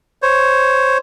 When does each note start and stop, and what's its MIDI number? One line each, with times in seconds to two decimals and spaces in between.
0.23 0.98 72
0.23 0.98 73